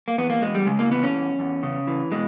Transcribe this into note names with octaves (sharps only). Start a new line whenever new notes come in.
A#3
E2 B3
A#3
E2 G#3
G3
C#3 G#3
A#3
E3 B3
C#4
E2
E2
C#3
E3
B2 G#3